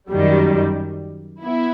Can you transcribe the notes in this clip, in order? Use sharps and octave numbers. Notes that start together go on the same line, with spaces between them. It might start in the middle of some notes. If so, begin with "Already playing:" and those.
F#2 D#3 G3
B3 E4